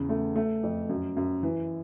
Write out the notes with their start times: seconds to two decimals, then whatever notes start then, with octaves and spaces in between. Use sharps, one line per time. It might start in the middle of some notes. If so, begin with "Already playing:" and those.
Already playing: E2 C#3
0.09 A3
0.36 A3
0.63 F2
0.89 F#2
1.17 F#2
1.43 E3